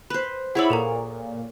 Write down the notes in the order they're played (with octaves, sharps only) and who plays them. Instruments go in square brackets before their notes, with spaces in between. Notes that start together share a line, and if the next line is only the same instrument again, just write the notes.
[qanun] B4 C5 [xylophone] B5
[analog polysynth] E4 B5 [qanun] G#4 C#5 D5 [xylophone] F#5 E6
[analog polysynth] A#2 [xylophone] A4 A#4 A#5